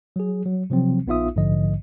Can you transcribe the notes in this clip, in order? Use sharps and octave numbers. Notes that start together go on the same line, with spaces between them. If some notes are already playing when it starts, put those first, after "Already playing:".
F#3 G#4
F#3
C3 F3 F#3 C4
A#1 B3 D#4 F4 E5 D#6
A#1 G#2 D3 F3 D#5